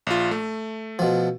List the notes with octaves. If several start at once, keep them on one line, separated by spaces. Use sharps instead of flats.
A#1 F4
A3
B2 F3